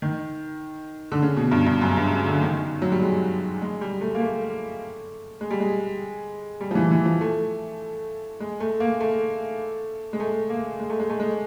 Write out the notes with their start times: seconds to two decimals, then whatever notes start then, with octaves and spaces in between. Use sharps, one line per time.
0.02 D#3
1.12 D3
1.22 C#3
1.36 B2
1.51 G2
1.66 G2
1.82 F#2
1.97 G2
2.12 C#3
2.27 D3
2.41 D#3
2.82 F#3
2.92 G3
3.02 G#3
3.62 G#3
3.81 G3
4.01 A3
4.15 A#3
4.21 A3
5.41 G#3
5.51 G3
5.60 G#3
6.61 G3
6.71 F3
6.75 E3
6.91 E3
7.05 F3
7.21 A3
8.40 G#3
8.60 A3
8.80 A#3
9.01 A3
10.13 G#3
10.20 A3
10.50 A#3
10.80 G#3
10.90 A3
10.99 G#3
11.10 A3
11.20 G#3